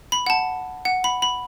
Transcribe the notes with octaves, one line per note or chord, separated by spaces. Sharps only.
B5
F#5
A5
F#5
B5
B5